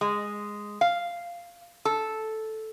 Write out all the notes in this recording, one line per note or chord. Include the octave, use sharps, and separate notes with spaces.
G#3
F5
A4